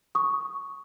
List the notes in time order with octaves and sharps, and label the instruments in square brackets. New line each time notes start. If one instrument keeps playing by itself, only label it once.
[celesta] C#6 D#6